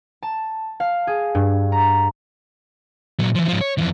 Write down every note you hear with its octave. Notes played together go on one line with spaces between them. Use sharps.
A5
F5
G#4
G2
A#5
A#2 F#3
E3 F3
G#2 F3
C#5
F2 E3